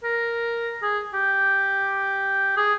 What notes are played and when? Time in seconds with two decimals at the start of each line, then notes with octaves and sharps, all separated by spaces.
0.04 A#4
0.82 G#4
1.14 G4
2.57 G#4